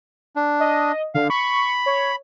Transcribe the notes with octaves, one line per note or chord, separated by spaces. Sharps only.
D4
D#5
D3 F5
B5 C#6
C#5